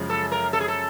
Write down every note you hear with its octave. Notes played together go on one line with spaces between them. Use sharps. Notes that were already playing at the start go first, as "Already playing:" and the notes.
Already playing: F#2 C#3 F3 G#3
A4
A#4
A4
G#4
A4